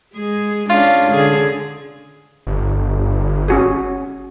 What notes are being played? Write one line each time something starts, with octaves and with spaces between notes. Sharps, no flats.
G#3 G#4
G#3 C#4 D4 F4
D3 G#4
G1
C#4 F#4 G#4